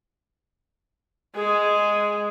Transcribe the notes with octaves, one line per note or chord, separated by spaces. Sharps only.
G#3 G#4